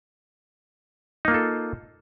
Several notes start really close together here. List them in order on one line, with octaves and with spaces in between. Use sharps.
D#4 A#3 F4 A4